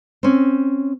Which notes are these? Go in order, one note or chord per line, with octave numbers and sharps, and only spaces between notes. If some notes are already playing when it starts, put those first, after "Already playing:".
C4 C#4